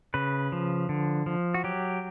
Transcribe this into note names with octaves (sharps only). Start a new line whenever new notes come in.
C#3 B4
F3
D3
F3
F#4
F#3 G4